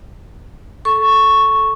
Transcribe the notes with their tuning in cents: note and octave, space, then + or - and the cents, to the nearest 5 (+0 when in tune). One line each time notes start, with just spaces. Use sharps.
A4 -10 C#6 +0